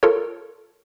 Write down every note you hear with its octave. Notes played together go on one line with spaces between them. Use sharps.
F4 A4 A#4 C#5